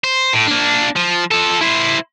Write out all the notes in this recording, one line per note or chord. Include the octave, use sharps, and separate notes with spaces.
C5
A2
A#3 D4
F3
F3 A4
E4 C5